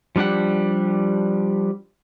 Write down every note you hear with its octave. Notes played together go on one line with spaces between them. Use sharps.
F3 G3 D4 G4 F#5